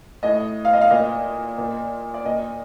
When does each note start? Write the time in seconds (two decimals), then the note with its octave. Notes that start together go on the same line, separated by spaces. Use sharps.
0.23 A2 D#5
0.65 F5
0.73 D#5
0.81 F5
0.90 A#2 D#5
1.58 A#2
2.14 D5
2.25 A#2 D#5